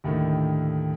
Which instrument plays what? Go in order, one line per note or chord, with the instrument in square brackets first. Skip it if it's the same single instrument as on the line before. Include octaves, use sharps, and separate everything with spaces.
[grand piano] D#2 A2 D3 D#3